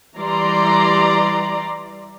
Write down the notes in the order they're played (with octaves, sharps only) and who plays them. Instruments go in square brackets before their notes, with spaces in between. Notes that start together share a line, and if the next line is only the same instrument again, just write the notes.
[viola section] E3 G3 D5 A#5 C6